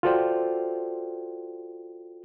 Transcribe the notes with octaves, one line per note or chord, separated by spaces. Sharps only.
F4 F#4 A4 C5 D5 G5